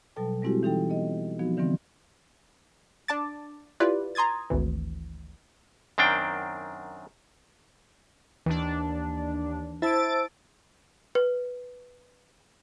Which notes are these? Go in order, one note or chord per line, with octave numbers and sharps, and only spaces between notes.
B2 F#3 G3 A4 G5 A5
G3 G#3 C4 E4 F#4 G4
E3 D#4 A4 G5
B3 D#5
F3 B3 C4 D#4 F#4
D3 E3 G3 B3 C4
D4 A5 D6 A6
E4 F4 G4 B4 D5
A#5 C6 D#6 G#6 A6
G#1 D2 E3
F#2 D#3 C4 D4 G5
D#2 E3 D4
E4 C5 A5 E6 A6 D7
B4